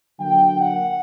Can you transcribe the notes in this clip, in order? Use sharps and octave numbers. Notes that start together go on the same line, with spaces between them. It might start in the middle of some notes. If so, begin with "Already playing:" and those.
D3 F#3 A#3 G5
F#5